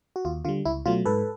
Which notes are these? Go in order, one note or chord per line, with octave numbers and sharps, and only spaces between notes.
F#4
D#2 F4
D3 G3 F4
C#2 E4
B2 F#3 A3 F4
G#2 A4 B4